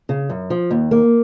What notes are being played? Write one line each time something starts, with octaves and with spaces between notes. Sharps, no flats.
C#3
F#2
F3
D#2
A#3